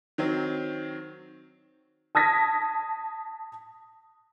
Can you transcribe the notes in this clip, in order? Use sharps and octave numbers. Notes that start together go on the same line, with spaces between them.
D#3 F#3 C4
A5 D#6 G#6 A#6 B6